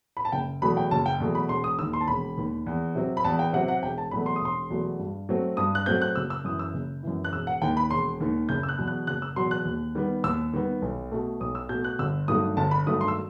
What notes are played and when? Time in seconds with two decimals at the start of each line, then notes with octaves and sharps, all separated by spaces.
0.17 B5
0.25 A5
0.32 F#1 G5
0.62 E2 B2 F#3 A3 B5
0.77 G5
0.91 F#1 A5
1.06 G5
1.20 E2 B2 F#3 A3
1.35 B5
1.49 E1 C6
1.64 D#6
1.79 D#3 E6
1.83 D#2
1.93 C6
2.01 A5
2.08 E1 B5
2.38 D#2 D#3
2.66 E2
2.95 C3 F#3 C4
3.17 B5
3.24 E2 A5
3.39 G5
3.53 C3 F#3 C4 F#5
3.68 F#5
3.82 E1 G5
3.98 A5
4.11 E2 B2 F#3 A3 B5
4.26 C6
4.36 D#6
4.41 E1 C6
4.70 E2 B2 F#3 A3
4.99 G2
5.29 F#3 A3 C4
5.57 G2 D#6
5.75 F#6
5.86 F#3 A3 C4 G6
6.02 F#6
6.15 F#1 E6
6.30 E6
6.44 F#2 E3 D#6
6.59 E6
6.74 F#1
7.03 F#2 E3
7.25 F#6
7.32 E1 E6
7.47 F#5
7.62 D#2 D#3 G5
7.77 B5
7.91 E1 C6
8.20 D#2 D#3
8.49 F#1 G6
8.63 E6
8.69 F#6
8.78 E2 B2 F#3
8.87 F#6
9.07 F#1 F#6
9.22 E6
9.36 E2 B2 F#3 C6
9.51 F#6
9.65 D#2
9.95 D#3 G3 B3
10.24 D#2 E6
10.53 D#3 G3 B3
10.82 B1
11.12 B2 A3
11.40 B1 D#6
11.55 E6
11.69 B2 G6
11.74 A3
11.84 F#6
11.99 G1 E6
12.28 G2 D#3 F#3 A3 D#6
12.57 G1 A5
12.71 B5
12.86 G2 D#3 F#3 A3 D#6
13.01 C6
13.08 E6